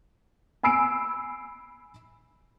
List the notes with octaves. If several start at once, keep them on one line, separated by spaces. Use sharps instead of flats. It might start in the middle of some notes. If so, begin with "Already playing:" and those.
G#5 B5 E6 C7 D7